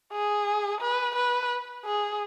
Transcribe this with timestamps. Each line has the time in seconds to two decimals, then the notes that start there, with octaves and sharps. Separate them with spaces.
0.13 G#4
0.81 B4
1.16 B4
1.85 G#4